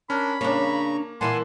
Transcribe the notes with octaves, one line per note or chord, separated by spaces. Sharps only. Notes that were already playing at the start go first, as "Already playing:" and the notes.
C#4 D4 A#4 B5
C#3 A#3 C#4 D4 A#5 C#6
A#2 E3 E4 F#5 G#5 A5 C6